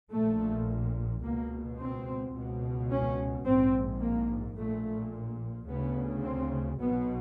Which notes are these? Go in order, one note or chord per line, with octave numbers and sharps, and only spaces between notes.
A#1 A#2 A3
C#2 B2 A#3
C4
C#2 B2
C#4
A#1 G#2 C4
A#3
A#1 A#2 A3
D2 C#3 B3
C4
B1 B2 B3